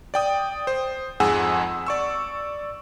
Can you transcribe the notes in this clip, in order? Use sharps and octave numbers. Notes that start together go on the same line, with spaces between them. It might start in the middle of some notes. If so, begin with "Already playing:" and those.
D5 G5 D#6
C5
F2 G#2 G#4 F#5 G#5 E6
D5 C#6 E6